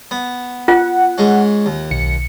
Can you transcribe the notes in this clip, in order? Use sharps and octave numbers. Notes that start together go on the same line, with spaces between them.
B3
F4 F#5
G#2 G#3 C#4
D#2
B1 C#7